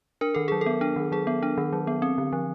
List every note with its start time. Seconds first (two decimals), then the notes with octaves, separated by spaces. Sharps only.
0.21 D4 A#4
0.34 D#3 A4
0.48 F#3 G#4
0.61 A4
0.66 B3
0.81 D4
0.96 D#3
1.12 F#3 G#4
1.27 B3
1.43 D4
1.58 D#3
1.73 F#3
1.87 B3
2.02 C4
2.18 D3
2.33 F3